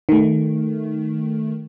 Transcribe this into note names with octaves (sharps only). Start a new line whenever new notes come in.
D#3 A3